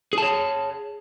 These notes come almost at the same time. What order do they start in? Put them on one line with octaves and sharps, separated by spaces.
G#4 A5 C#5